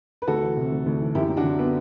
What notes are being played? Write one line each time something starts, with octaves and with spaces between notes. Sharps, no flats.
B4
D2 F#4 A4
E3
C3
D2
D2
E3
F#2 E4 G4
F#3
D4 F#4
D3
B3 D4